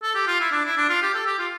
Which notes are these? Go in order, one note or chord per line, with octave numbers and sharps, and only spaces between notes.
A4
G4
F4
E4
D4
E4
D4
F4
G4
A4
G4
F4